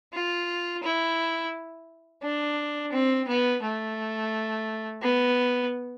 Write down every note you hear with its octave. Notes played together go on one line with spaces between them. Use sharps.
F4
E4
D4
C4
B3
A3
B3